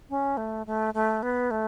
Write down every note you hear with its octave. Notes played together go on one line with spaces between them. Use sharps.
C#4
A3
A3
A3
B3
A3